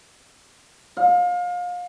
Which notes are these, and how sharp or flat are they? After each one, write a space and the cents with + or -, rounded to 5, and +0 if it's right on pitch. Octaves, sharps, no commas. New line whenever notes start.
F5 +30